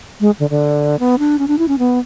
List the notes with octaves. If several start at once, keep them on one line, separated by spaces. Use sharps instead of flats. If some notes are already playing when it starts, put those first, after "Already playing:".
G#3
D3
D3
B3
D4
C#4
D4
E4
C#4
B3